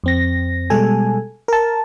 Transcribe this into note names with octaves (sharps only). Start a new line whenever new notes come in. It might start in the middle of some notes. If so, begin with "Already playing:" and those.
F2 C4 A#6
B2 G3 G#3 A4 G#5
A#4 A5